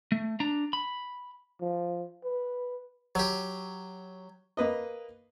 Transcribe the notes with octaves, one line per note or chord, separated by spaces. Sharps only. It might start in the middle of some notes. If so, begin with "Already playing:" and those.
A3
D4 A#5
B5
F3
B4
F#3 G4
A#3 B4 D#5